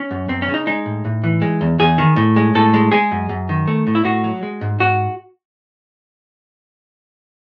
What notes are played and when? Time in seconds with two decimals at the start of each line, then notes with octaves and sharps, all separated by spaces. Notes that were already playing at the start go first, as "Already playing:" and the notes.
Already playing: C#4
0.11 F#2
0.28 F#2 C4
0.42 C#4
0.48 C#3
0.54 D#4
0.67 G#3 D#4
0.86 A2
1.05 A2
1.24 E3
1.42 G#3
1.61 E2
1.79 E2 G#4
1.98 D#3
2.16 A2
2.36 G#3
2.55 A2 A4
2.74 G#3
2.92 G#3 G#4
3.12 F#2
3.29 F#2
3.49 D#3
3.68 A3
3.87 A2
3.95 E4
4.04 A2 F#4
4.24 F#3
4.43 G#3
4.61 G#2
4.79 G#2 F#4